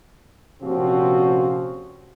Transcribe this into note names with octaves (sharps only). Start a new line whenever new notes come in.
A#1 C3 F3 C4 C#4 F#4